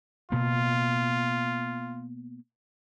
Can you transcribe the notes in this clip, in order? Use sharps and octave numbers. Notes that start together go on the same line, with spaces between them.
B2 A#3 F4